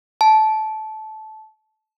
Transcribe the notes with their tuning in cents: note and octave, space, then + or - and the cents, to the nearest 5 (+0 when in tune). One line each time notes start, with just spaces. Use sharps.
A5 -15